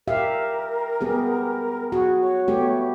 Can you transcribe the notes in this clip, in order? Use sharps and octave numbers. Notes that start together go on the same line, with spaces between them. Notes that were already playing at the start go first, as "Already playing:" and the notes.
G4 A#4 E5 F5
B3 G4 G#4
F#4 G#4
C#5
A3 B3 G4